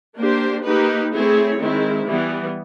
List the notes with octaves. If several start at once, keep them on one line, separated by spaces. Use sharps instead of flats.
A#3 D4 G4 C5
A#3 D#4 G4 B4
A3 C4 E4 G#4 C#5
D#3 G#3 C4 E4
E3 G3 B3